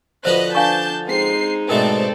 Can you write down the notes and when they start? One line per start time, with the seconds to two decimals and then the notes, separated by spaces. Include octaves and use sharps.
0.25 D3 F3 F#4 B4 C5 D#5 F#6
0.55 D4 F5 G#5 A5 C#6 G6
1.07 G#3 C4 D#4 C7
1.69 G#2 B2 A3 C4 A4 A#4 D5